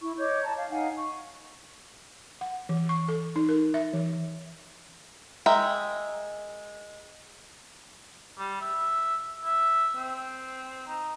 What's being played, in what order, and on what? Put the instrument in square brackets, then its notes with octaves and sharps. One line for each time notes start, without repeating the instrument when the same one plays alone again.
[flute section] E4 C#6
C#5 D#5 D6 G6
A5 A#5
F5
D#4 F5 F#5 G#5
C#6
[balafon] F#5
E3
C#6
A4
D#4
A#4
E5
E3
[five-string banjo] G#3 A#4 E5 G5
[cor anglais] G3
E5
E5
C4
D#4